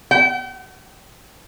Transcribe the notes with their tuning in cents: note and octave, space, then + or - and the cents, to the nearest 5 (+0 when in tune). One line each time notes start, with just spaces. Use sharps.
G5 -40